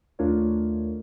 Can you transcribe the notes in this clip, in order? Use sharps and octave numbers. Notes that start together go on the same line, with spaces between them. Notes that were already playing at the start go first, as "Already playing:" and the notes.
D#2 A3 D4 F4 A#4 C#5